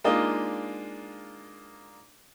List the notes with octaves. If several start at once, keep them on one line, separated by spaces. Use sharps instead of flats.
G#3 A#3 D4 D#4 F4 D#5